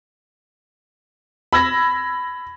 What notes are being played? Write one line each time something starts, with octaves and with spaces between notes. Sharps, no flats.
B5 E6 G#6 A#6